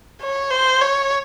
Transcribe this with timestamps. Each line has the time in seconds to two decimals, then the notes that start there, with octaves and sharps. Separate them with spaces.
0.22 C#5
0.51 C5
0.81 C#5